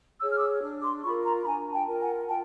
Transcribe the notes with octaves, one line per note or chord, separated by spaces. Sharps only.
G#4 C#5 E6
F6
D6 E6
D4
C6 D6
F4 A#4 B5 C#6
A#5 C6
B5
D4 G#5 A#5
G5 A5
F4 A#4
F#5 G#5
F4 G5 A5